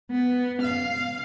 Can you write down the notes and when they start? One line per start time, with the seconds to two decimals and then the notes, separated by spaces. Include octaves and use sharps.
0.11 B3
0.62 F5